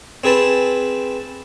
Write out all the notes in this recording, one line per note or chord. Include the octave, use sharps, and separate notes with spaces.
C4 G#4 B4 A5